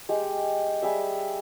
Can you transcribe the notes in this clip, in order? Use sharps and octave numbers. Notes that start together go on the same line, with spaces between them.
G#3 G4
G3 G#4 E5